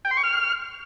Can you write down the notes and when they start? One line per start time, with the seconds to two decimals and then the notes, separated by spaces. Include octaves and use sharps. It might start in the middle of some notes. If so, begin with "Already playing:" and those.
0.05 G5
0.11 C6
0.17 C#6
0.23 F6